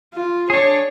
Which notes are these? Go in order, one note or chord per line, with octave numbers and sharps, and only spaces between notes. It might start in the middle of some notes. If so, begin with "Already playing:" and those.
F4
D4 G#4 C#5